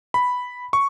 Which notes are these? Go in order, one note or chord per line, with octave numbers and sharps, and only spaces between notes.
B5
C#6